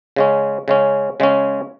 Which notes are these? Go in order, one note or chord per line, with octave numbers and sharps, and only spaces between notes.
C#3 G#3 C#4
C#3 G#3 C#4
C#3 G#3 C#4